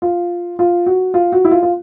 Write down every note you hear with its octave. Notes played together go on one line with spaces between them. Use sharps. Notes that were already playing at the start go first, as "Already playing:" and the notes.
F4
F4
F#4
F4
F#4
E4
F4
F4